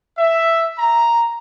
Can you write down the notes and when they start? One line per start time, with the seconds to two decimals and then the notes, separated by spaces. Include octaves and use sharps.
0.18 E5
0.79 A#5